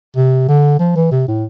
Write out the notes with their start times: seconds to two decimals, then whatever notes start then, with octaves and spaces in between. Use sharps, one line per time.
0.16 C3
0.49 D3
0.80 F3
0.96 E3
1.11 C3
1.28 A2